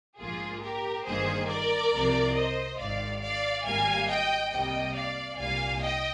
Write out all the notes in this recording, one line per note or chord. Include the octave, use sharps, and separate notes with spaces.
A#1 G#2 F3 A#3 F4 G#4
G4 A#4
G1 G2 D#3 A#3 G#4 C5
A#4 D5
C2 C3 F3
C5 D#5
G#1 G#2 D#3 D5 F5
D5 F5
G#1 G#2 G3 A#3 F5 G#5
D#5 G5
C2 C3 G3 A#3 D#5 G5
D5 F5
C2 A#2 G3 A#3 F5 G#5
D#5 G5